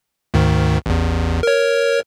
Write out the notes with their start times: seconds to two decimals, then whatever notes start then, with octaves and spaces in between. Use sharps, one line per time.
0.34 D2 G#2 D#3
0.86 A1 E2
1.43 A#4 C#5